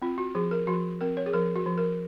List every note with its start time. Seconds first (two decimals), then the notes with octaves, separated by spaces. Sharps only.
0.02 C4 F4
0.18 F#4
0.35 F3 G#4
0.51 A#4
0.67 F3 F#4
1.01 C4 A#4
1.17 C#5
1.26 G#4
1.34 F3 A#4
1.56 F#4
1.66 F3
1.78 A#4